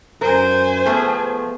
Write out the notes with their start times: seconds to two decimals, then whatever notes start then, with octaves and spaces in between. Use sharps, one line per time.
0.21 F#2 A#4 C5 G#5
0.85 F3 A3 B3 G#4